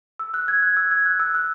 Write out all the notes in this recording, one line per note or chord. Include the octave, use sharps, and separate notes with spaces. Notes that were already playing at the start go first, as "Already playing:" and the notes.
E6
F#6
G#6
F#6
E6
G#6
F#6
E6
F#6